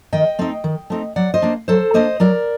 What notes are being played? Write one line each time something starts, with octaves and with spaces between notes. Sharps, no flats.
D#3 D#5 G5
A3 C4 D#4
D#3
A3 C4 D#4
F#3 D5 F#5
C5 D#5
A#3 D4
F#3 A4 C5
A#3 D4 C5 D#5
F#3 A#4 D5